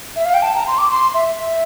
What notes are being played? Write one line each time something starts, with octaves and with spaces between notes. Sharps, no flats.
E5
F5
G5
A5
A#5
C6
D6
C6
E5
E5